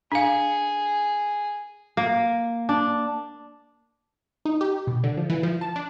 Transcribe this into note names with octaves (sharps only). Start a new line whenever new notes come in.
D4 G#4 F5
A#3
D4
D#4
G4
B2
D3
F3
E3
F3
A5
D4